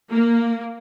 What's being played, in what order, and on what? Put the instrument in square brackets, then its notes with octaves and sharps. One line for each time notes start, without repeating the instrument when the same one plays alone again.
[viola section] A#3